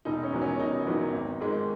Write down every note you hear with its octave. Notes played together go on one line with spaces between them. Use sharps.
E1 D#4
C#4
E2 D#3 F#3
C#4
E1 D#4
E2 D#3 F#3
G#1
G#2 D#3 G#3